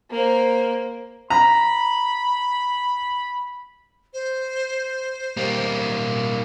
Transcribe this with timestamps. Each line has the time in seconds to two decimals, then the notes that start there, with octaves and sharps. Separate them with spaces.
0.11 A#3 C5
1.30 A#5 B5
4.13 C5
5.37 G3 A#3